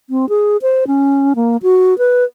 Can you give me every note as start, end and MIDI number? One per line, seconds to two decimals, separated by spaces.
0.10 0.29 60
0.29 0.57 68
0.62 0.87 72
0.87 1.33 61
1.36 1.57 58
1.63 1.97 66
1.98 2.24 71